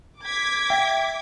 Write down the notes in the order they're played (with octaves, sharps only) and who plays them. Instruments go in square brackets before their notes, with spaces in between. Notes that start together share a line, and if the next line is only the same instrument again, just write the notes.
[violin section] D6 G#6 B6
[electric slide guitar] E5 G5